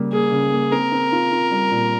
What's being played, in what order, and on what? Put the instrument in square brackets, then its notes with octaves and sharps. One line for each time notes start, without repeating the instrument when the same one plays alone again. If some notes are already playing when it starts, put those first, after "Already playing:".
Already playing: [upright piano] C#3 G3 A#3
[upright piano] A#3 [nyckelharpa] G#4
[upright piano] C#3
A#3
[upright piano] C4 [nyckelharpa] A#4
[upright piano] C4
F4
F4
G3
A#2